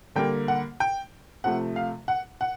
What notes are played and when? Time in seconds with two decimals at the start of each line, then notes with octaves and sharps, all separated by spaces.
0.15 D3 G3 A#3 G5
0.48 F#5
0.80 G5
1.44 C3 F3 A3 F#5
1.76 F5
2.08 F#5
2.41 F#5